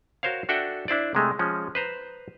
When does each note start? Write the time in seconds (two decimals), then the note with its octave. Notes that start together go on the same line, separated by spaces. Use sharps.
0.23 F#4 A#4 C5 C#5 F5
0.49 D4 F#4 A4 E5 F#5 G5
0.88 D4 E4 C5 D5
1.15 C3 G#3 A3
1.39 F3 G#3 C#4
1.75 B4 C5 A#5